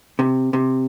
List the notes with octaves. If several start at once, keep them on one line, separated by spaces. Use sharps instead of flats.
C3
C3